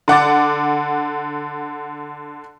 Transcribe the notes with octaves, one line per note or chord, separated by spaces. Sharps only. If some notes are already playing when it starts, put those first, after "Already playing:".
D3 F#5 D6 A6